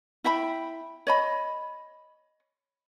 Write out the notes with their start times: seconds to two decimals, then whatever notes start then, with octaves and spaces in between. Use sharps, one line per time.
0.24 E4 E5 G5 B5
1.07 C#5 D#5 B5